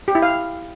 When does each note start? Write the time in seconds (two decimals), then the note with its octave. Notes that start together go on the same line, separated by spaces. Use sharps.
0.08 G4
0.15 E4
0.22 F5